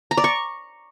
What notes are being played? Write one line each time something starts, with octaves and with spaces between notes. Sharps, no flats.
A#5
D5
C#6